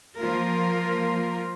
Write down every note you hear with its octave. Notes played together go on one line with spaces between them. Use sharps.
F3 A#3 F4 A#4